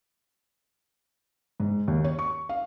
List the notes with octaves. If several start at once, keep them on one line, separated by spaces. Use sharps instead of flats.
G#2
D#2
C#5
C#6
F5